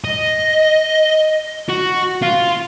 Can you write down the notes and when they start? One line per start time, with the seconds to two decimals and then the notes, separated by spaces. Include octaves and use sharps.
0.04 D#5
1.69 F#4
2.22 F4